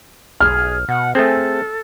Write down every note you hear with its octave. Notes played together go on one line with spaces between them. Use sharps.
B1 G#4 F6
B2 F#5
A3 C4 G#4 A4